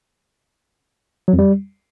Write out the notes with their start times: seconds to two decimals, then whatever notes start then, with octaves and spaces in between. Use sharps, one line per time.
1.28 F#3
1.33 F2
1.39 G3